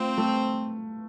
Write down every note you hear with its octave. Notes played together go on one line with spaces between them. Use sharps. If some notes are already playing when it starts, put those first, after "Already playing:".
Already playing: A3 C4 F4
A3